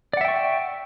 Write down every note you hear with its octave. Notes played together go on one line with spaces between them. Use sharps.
D5 E5 F#5 G5 C#6